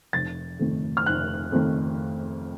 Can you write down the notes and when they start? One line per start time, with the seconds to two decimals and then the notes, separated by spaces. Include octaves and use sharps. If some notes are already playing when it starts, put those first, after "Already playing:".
0.13 F1 A6
0.59 F2 D#3 A3
0.97 F6
1.06 F1 F#6
1.52 F2 D#3 A3